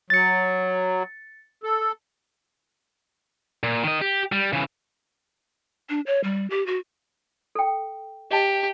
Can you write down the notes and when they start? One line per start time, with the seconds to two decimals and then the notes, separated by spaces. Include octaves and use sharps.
0.10 F#3 A6 C#7
1.63 A4
3.63 A#2
3.83 D#3 D#5
4.01 G4
4.32 G3
4.53 C#3 E3
5.90 D4
6.07 C#5
6.24 G3
6.50 G4
6.67 F#4
7.55 A4 G5
8.31 G4 D#5 A5